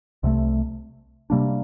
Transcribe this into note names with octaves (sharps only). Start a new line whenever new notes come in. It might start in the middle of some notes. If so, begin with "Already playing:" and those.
C2 C3 F3 A3
C3 G3 A#3 D4